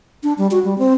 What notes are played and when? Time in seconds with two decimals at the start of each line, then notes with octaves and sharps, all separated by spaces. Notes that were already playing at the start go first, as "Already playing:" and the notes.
0.23 D4
0.38 G3
0.51 F#4
0.65 G3
0.78 C4